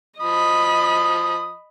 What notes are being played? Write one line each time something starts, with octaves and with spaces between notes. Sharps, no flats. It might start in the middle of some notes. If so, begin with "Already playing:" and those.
F3 D#5 B5 D#6